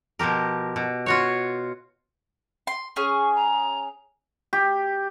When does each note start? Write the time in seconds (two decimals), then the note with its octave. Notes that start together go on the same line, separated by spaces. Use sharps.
0.19 B2 F3 G4 A#4
0.76 B2
1.06 F4 F#4 C#5
2.67 C6
2.96 C#4 G#4 C#6
3.35 A#5
4.53 G4